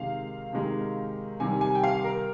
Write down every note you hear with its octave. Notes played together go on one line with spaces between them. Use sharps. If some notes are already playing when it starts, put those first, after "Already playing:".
Already playing: C3 D#3 G#3 F5
C3 D#3 G#3
C3 D#3 G3 G#5
G#5
G5
F5
A#4